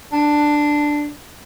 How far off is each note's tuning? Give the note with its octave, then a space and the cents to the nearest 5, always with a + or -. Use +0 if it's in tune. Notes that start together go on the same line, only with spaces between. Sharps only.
D4 +5